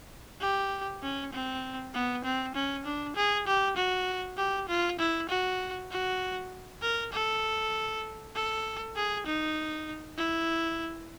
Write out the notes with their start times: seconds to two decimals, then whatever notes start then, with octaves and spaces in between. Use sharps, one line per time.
0.41 G4
1.03 C#4
1.33 C4
1.94 B3
2.25 C4
2.55 C#4
2.85 D4
3.16 G#4
3.47 G4
3.77 F#4
4.37 G4
4.69 F4
4.99 E4
5.29 F#4
5.91 F#4
6.82 A#4
7.13 A4
8.35 A4
8.96 G#4
9.26 D#4
10.18 E4